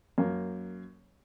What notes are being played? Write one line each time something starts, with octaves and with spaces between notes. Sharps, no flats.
F#2 A#3